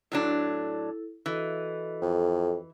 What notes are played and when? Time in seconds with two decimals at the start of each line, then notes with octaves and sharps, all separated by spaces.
0.12 A2 F#3 D4 E4 A4
1.26 E3 F#4 A4 D#5
2.02 F2